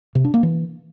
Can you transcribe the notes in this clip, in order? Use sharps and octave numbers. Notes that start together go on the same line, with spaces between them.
C3
D4
A#3
E3